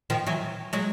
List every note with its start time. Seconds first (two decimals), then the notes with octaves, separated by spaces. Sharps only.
0.10 D#3 F3
0.27 E3 F#3
0.73 F#3 G#3